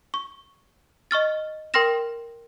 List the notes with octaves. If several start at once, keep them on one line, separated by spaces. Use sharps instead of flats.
C#6
D#5 C#6 F6 A6
A#4 G5 C6 F6 A#6 E7